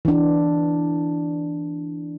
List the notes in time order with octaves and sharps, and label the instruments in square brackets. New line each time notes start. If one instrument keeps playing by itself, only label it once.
[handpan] E3 D4